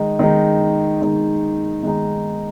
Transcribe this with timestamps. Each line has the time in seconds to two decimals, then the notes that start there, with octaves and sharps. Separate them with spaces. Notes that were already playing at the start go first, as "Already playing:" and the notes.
Already playing: D#3 G#3 D#4
0.19 D#3 G#3 D#4
1.01 D#3 G#3 D#4
1.83 D#3 G#3 D#4